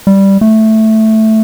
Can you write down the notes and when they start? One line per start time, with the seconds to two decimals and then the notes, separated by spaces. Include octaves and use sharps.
0.07 G3
0.41 A3